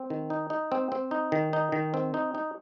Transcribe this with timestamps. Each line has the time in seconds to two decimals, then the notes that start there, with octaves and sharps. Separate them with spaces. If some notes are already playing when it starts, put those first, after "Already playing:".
Already playing: C4
0.10 D#3
0.30 D#4
0.50 D#4
0.72 C4
0.92 C4
1.11 D#4
1.32 D#3
1.53 D#4
1.72 D#3
1.94 C4
2.14 D#4
2.35 D#4